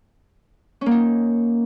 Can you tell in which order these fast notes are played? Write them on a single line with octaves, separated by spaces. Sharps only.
C#4 A#3 D#4